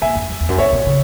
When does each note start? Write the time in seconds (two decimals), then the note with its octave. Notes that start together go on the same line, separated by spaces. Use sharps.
0.02 A#2 E5 G#5
0.16 F#2
0.30 F#2
0.40 E2
0.49 F#2
0.58 B2 C#5 E5
0.72 B2
0.86 C#3